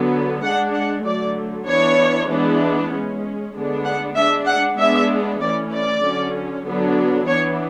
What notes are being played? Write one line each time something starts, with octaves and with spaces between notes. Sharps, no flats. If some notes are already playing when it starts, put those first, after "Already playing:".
Already playing: D3 F#3 B3
G#3 D4 F#5
F#5
D3 F#3 A3 D5
E3 B3 D4 C#5
E3 G#3 B3 D4
G#3 C#4
D3 G#3 B3 D4
F#5
G#3 D4 E5
F#5
G#3 B3 D4 E5
E3 A3 C#4 D5
D5
D3 F#3 C#4
D3 F#3 B3 D4
E3 B3 D4 C#5